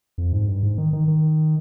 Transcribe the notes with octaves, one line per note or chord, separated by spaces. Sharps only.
F2
G#2
G2
G#2
D#3
D#3
D#3